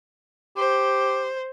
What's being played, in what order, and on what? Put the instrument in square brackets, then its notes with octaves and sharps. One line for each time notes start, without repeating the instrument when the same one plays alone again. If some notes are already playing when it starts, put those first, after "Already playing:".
[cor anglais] G4 [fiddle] C5